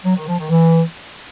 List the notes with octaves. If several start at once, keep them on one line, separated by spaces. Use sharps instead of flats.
F#3
D#3
F3
D#3
E3